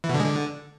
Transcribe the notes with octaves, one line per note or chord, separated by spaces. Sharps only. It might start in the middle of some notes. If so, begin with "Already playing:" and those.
E3
B2
D3
G#3
D3